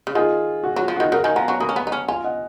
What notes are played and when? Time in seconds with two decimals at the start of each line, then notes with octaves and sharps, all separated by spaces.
0.07 C#3
0.15 D#3 F4 G#4
0.64 F#4
0.76 F#3 F4
0.88 F3
0.96 F#4
1.00 D#3
1.11 C#3 F#4 A#4
1.24 D#3 F5 G#5
1.36 F3 F#5 A#5
1.48 F#3 A#5 C#6
1.60 A#3 B5 D#6
1.69 C#4
1.76 B3
1.87 D#4
1.92 C#4
2.08 F4 F5 G#5
2.24 D#5 F#5